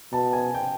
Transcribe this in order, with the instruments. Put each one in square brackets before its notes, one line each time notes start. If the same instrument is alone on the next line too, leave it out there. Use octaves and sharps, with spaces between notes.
[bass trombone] B2 [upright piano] A5
[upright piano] G#5
G5